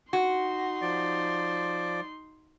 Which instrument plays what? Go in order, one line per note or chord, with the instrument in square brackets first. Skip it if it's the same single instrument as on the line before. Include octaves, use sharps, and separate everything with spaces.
[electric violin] D#4 C6 [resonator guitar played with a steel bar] F#4
[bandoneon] F3 D5